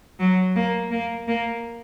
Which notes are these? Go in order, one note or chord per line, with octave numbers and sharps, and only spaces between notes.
F#3
A#3
A#3
A#3